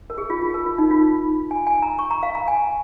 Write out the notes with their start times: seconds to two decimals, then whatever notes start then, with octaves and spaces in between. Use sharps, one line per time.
0.10 A#4
0.18 G#4
0.30 F4
0.42 F4
0.54 A#4
0.66 F4
0.78 D#4
0.91 F4
1.51 G#5
1.67 G#5
1.82 A#5
1.99 C#6
2.11 A#5
2.23 F5
2.35 A#5
2.48 G#5